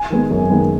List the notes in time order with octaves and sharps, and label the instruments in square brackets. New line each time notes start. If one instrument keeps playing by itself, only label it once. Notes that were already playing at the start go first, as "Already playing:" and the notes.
Already playing: [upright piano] G#5
D#3 G#3 B3
F#2
D#3 G#3 B3